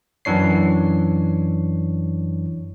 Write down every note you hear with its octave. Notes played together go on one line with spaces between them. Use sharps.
F#2 E3 D4 C#5 C7